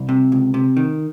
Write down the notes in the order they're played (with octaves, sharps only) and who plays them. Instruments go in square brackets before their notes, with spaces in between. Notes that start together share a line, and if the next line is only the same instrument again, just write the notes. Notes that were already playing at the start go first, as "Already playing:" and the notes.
Already playing: [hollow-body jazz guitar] C2
C3
C#2
C3
D#3